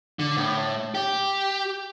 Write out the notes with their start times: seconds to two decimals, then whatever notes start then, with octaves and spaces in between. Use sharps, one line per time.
0.19 D3
0.37 A2
0.95 G4